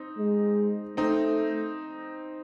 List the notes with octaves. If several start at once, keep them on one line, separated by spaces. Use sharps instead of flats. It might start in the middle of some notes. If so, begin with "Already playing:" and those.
Already playing: C4 D#4
G#3
A3 C4 D#4